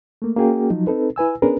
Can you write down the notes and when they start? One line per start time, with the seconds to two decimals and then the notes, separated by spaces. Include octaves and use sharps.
0.22 A3 A#3
0.36 A#3 C#4 F#4 G#4 G5
0.70 F3 F#3 D#4
0.87 C4 D#4 A4 B4
1.16 E4 B4 G#5 E6
1.42 B3 C#4 D4 G#4 A#4 B4